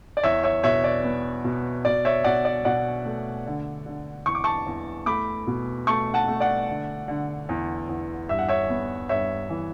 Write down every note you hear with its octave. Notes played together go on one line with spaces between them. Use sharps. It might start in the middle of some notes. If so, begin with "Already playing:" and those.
D5
E2 C#5 E5
C#5 E5
B2 C#5 E5
D5
B3
B2
B2 D5
C#5 E5
B2 D5 F#5
D5
B2 D5 F#5
A3
D3
D3
E2 C#6
D6
A5 C#6
E2
A3 B5 D6
B2
A3 A5 C#6
F#5 A5
A3
D5 F#5
D3
D3
E2
E2
G2 E5
F#5
C#5 E5
B3
G2 C#5 E5
E3